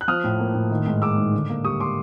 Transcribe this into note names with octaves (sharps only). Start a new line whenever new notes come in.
F#6
F3 D#6 F6
A2
A#3
A2
D#3
G#2
G#3 D6 E6
G#2
D3
A#3
G3 C#6 D#6
C6 D6